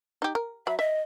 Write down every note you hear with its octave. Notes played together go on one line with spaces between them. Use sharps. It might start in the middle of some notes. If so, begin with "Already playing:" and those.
D#4 G4
A#4
F#3 E5 B5
D#5 E5